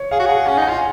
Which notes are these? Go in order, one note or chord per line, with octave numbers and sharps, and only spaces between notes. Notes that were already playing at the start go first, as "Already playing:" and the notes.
Already playing: C#5
G#4 F5
F#4
G#4 F#5
C#4 G#5
D#4 G#5
F4